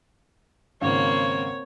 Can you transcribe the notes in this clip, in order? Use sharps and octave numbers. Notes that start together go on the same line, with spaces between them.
G#1 C#3 A#3 C4 C#5